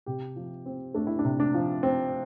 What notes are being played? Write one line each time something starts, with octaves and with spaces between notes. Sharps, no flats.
C3 G4
F3
C4
A3 D4
E4
D4
C3
D4
F3
C4